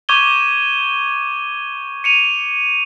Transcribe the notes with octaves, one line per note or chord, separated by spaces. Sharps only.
C#6 D6 G6 G#6 D#7 G7
C#7 D#7 F7